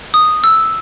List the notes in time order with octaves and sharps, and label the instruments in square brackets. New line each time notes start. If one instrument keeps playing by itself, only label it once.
[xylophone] D#6
E6